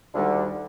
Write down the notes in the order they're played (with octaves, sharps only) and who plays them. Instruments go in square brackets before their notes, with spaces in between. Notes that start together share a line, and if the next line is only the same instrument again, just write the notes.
[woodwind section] D2 D3 [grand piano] D#3 G3 D4 F4